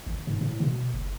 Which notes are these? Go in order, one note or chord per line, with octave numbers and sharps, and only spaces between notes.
G#1
G#2
A2
B2
F#1